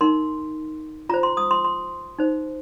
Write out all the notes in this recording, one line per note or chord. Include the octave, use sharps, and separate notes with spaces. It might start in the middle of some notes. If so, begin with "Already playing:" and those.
D#4 A#4 C6
F4 C5 A#5
C6
D#6
C6
C6
D#4 C5